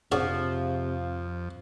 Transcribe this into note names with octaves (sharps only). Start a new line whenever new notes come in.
F2 C3 F3 D4 F#4 G#4